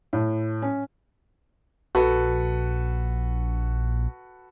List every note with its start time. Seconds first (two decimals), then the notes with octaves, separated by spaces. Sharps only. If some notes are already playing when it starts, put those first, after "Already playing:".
0.13 A2
0.62 C#4
1.95 A#1 F#4 A4 B4